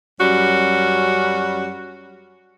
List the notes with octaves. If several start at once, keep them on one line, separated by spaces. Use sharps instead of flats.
F#2 G3 C#4 F#4